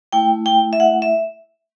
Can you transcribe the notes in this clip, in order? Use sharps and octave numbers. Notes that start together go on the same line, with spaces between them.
A3 E4 G5
G5
E5
F#5
E5